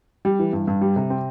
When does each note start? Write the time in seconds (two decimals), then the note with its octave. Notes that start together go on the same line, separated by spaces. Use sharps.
0.25 G3
0.39 E3
0.53 G2
0.68 G2
0.81 G3
0.96 C3
1.10 C4